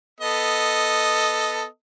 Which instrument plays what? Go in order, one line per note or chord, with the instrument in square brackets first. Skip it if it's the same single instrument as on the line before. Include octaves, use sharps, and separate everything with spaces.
[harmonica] B3 A4 D#5